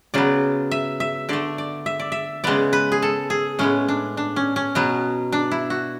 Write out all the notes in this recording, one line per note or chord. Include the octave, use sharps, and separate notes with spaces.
C#3 F#3 B3 D5
E5
E5
D3 A3 D5
D5
E5
D5
E5
C#3 G#3 B3 D5
B4
G#4
A4
G#4
A2 G#3 B3 C#4
D4
D4
C#4
C#4
B2 F#3 B3
D4
E4
F#4